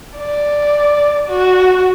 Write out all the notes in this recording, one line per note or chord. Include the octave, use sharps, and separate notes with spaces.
D5
F#4